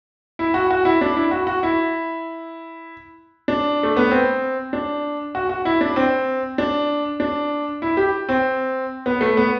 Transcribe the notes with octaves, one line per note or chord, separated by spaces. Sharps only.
E4
F#4
F#4
E4
D4
E4
F#4
F#4
E4
D4
A3
B3
C4
D4
F#4
F#4
E4
D4
C4
D4
D4
E4
G4
C4
B3
A3
B3